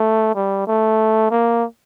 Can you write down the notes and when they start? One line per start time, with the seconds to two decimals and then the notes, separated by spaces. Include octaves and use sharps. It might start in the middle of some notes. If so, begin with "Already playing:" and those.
Already playing: A3
0.35 G3
0.67 A3
1.31 A#3